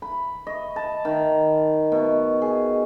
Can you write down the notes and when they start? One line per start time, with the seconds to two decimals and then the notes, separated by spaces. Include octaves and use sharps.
0.02 B5
0.47 D#5
0.76 A5
1.05 D#3
1.92 B2
2.42 G#4